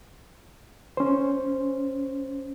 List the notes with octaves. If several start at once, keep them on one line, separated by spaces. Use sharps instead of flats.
C#4 C5